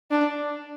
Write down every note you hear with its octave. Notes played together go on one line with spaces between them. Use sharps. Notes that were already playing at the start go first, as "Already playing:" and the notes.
D4